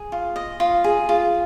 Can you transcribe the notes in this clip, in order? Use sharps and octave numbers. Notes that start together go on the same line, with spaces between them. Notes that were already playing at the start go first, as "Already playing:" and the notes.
Already playing: G#4
F4
D#5
F4
G#4
F4